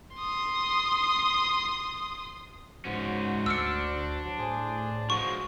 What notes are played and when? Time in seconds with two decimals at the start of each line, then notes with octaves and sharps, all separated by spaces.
0.17 C6 D#6
2.85 G#2 C#4 F#4 C5
3.46 D2 D4 E6 F6 C#7
4.25 F#3
4.38 A2 G#4 C5
5.10 F3 G#3 F#4 C#6